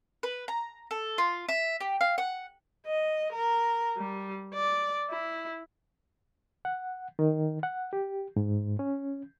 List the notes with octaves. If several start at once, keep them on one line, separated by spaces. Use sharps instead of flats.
B4
A#5
A4
F4
E5
G4
F5
F#5
D#5
A#4
G3
D5
E4
F#5
D#3
F#5
G4
G#2
C#4